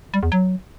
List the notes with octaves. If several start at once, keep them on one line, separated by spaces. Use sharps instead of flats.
G3
E2
F#3